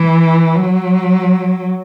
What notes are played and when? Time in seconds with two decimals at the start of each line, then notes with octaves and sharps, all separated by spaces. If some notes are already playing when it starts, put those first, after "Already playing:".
Already playing: E3
0.56 F#3